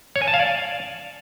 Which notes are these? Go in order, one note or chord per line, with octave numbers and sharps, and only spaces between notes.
C#5
G#5
A5
F5
D5